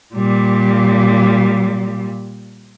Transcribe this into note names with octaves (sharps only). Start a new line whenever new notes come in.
A#2 G3